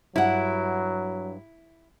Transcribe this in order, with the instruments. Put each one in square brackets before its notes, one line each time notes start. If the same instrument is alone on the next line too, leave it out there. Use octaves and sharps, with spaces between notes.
[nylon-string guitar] G2 F#5 [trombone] F#3 [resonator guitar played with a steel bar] E4